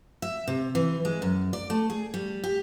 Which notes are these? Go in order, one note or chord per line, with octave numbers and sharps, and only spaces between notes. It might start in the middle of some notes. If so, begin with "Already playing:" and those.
E5
C3
E3
G#3
F#2
D5
A3
G#4
G3
G4